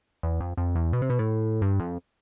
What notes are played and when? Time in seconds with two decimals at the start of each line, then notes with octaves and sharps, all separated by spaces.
0.23 E2
0.40 F2
0.57 F2
0.75 E2
0.93 B2
1.02 C3
1.10 B2
1.19 A2
1.62 G2
1.80 F2